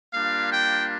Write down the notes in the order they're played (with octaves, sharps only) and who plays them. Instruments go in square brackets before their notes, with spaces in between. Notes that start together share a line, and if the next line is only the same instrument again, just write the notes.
[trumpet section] G3 A#3 D4 F4 F5
G5